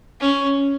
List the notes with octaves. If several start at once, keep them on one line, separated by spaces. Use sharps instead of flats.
C#4